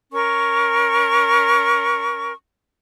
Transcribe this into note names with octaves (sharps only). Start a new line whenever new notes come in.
C#4 A#4 C#6